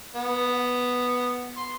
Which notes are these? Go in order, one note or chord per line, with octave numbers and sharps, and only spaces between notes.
B3
C6